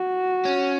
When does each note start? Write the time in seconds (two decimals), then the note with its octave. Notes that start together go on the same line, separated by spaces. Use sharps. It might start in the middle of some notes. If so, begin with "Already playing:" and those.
Already playing: F#4
0.45 C#4